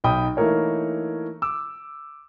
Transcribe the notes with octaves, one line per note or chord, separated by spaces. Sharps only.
B1 D#4 G5 B5 D#6
E3 A3 A#3 D#4 A#4 C#5
D6 E6